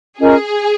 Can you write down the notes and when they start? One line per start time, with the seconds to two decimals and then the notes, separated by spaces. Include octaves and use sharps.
0.19 C#4 F4 G#4 A#4 D#5